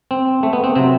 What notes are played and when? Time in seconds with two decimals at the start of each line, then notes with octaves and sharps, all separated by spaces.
0.11 C4
0.43 A3
0.53 B3
0.64 C4
0.75 C3 F#3 C4